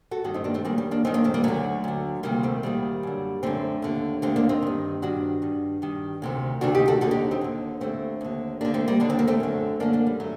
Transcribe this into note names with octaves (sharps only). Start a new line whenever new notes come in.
F#4 A4
G2 D#3 D4 F#4
C4 D#4
A#3 D4
A3 C4
F#2 D#3 G3 A#3
G3
A#3 D4
F#2 D#3 C4 D#4
A#3 D4
A3 C4
G3 A#3
D2 D3 F#3 A3
D2 D3
D2 C3 D#3 G3 A#3
A3 C4
D2 C3 D#3 G3 A#3
F#2 D3
F#2 D3 A3 C4
D#2 D3
D#2 D3 A3 C4
A#3 D4
C4 D#4
G2 D#3
G2 D#3 D4 F#4
G2 D#3
G2 D#3
D2 C3 D#3
D2 C3 D#3 D4 F#4
D#4 G4
F#4 A4
D#2 D3 F#4 A4
D#4 G4
C4 D#4
D#2 D3
D#2 D3 A3 C4
D#2 D3
D#2 D3 A#3 D4
A3 C4
G3 A#3
D#2 D3 D4
C4
A#3
A3 C4
F#2 D3
F#2 D3 A#3 D4
A#3 D4
G3
F#3 A3